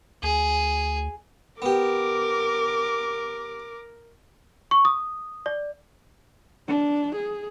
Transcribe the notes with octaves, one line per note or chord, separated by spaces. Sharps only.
D2 G#4
B3 G4 A#4 D6
C#6
D#6
D5
D4
G#4